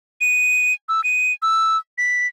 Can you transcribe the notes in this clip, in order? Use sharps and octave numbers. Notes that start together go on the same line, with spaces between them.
D#7
E6
D#7
E6
B6